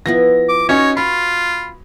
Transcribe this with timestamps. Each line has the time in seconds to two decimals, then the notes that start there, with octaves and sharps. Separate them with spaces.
0.06 F3 B3 E4 A#6
0.49 D6
0.69 C#4 D#4 F#4 C#5
0.97 F4 B5 C#6